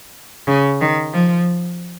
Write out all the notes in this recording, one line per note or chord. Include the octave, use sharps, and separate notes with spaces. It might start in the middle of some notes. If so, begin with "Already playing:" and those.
C#3
D#3
F3